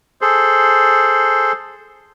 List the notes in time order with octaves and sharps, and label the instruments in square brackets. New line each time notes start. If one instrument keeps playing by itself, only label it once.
[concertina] G#4 A4 C5